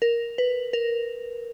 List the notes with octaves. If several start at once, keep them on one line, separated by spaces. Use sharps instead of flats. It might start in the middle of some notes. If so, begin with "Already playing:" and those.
A#4
B4
A#4